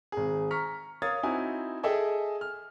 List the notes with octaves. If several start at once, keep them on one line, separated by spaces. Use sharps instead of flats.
G#1 G#4
A#5 C#6 F6 B6
A#4 C#5 F5 D#6 G#6 A6
C4 D#4 E4 F#4 G#5
G#4 A4 D#5 E5 G5 G#5
F6